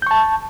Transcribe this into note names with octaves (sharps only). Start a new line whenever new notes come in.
A5 C#6 G6